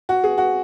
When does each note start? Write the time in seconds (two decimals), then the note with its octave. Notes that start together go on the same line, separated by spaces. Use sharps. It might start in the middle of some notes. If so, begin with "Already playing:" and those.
0.09 F#4
0.24 G#4
0.38 F#4